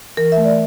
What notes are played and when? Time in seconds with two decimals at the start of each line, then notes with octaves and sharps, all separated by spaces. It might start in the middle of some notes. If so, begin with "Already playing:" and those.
0.17 E3 A#4
0.32 A3 E5
0.44 D5